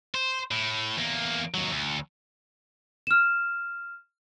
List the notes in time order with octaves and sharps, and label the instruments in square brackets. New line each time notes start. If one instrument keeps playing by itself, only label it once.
[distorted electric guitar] C5
A2
E2 A#3
D#2 F#3
D2
[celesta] F6 E7